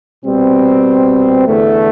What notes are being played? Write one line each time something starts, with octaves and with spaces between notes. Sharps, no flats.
B2 G3 C4
E2 D3 A3